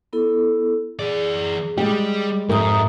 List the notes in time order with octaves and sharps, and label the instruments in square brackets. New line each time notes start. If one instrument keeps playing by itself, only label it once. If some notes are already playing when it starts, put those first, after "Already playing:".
[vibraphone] B3 E4 A4
[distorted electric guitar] E3 D5 [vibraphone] G#4
[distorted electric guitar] G3 [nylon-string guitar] G#3 G4
[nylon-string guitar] F2 G4 A#4 [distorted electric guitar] G#2 [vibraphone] E5 A#5 D#6